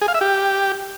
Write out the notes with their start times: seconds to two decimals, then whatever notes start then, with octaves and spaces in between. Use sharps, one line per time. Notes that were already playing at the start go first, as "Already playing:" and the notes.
0.01 G#4
0.08 F5
0.14 E5
0.21 G4